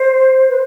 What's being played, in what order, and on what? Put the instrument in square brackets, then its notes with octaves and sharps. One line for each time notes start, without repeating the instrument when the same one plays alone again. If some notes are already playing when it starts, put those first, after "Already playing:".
Already playing: [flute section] C5
B4